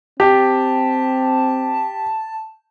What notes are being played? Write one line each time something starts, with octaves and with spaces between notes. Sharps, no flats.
C4 G4 A5